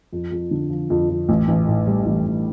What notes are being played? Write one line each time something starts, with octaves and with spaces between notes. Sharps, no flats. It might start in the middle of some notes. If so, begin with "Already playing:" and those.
F2
F2
D3
F3
F2
F2
A1
A1
A2
G3
A1
A1